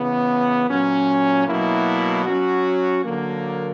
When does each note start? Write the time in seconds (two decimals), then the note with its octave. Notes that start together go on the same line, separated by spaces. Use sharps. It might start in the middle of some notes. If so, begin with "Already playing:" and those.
Already playing: C#3 E3 B3
0.67 A#2 F#3 C#4
1.46 B2 F#3 A#3 E4
2.25 F#3 C#4 F#4
3.04 D3 F#3 A#3